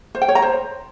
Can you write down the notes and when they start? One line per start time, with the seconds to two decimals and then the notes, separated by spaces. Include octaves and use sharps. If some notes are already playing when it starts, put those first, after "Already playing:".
0.15 C5
0.22 G5
0.28 C#5
0.35 A#5
0.42 C5